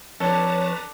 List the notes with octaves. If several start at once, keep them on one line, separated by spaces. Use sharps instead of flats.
F2 D4 A4 B4 C#5 A5 A#5